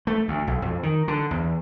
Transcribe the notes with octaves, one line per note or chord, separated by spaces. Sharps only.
A3
D2
B1
F2
D#3
D3
E2